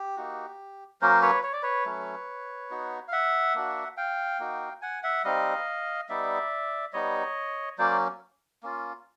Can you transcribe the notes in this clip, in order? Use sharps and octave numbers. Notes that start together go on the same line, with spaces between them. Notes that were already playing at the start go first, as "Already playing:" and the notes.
Already playing: G4
A#3 D#4 F#4
F#3 A#3 C#4 A#4 C5
B4 C#5
C#5
D5
B4 C#5
F#3 A3 C#4
B3 D#4 F#4
F5
E5 F#5
A#3 D4 F#4
F5 G5
A#3 D#4 F#4
F#5 G#5
E5 F#5
G3 C4 D#4 D#5 F5
G3 B3 D#4 D5 E5
G3 B3 D#4 C#5 D#5
F#3 A#3 C#4 C5 D5
A#3 C#4 F4